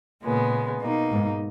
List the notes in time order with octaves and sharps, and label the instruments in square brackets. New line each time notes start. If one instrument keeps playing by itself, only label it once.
[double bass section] A#2 [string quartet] C#3 G#3 B3
[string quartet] B2 A#3 D#4
[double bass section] G#2